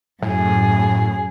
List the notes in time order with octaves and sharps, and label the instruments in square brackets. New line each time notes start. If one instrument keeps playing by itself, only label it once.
[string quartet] F#2 G#4 [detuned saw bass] A2